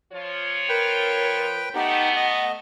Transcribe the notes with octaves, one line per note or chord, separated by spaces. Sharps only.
F3 F4 C#5
A#4 B4 G5
A3 B3 D#4 G4 F#5
D#5